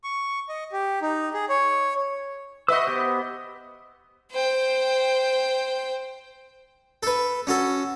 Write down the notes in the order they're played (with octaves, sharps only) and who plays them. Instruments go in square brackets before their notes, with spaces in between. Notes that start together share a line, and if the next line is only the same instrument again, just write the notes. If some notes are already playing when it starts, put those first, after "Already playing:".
[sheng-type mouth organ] C#6
D#5
G4
D#4
G#4
C#5
[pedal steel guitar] F#4 E5 E6 [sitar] B4 D#5
[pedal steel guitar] B3 G4 C5
[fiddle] C5 G5
[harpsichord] A4 B4
C#4 F#4 A4